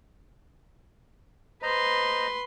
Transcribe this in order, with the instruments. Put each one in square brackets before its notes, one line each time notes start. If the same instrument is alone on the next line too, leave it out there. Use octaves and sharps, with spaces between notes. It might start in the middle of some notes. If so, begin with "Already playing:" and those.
[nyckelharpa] B4 C6 [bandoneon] C5 D#5 A#5